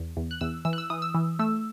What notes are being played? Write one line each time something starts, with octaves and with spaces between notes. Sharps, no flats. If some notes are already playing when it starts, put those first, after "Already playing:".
Already playing: E2
E2
F#6
E2 E6
E3 E6
F#6
E6
E3 D#6
E6
E3
A3 E6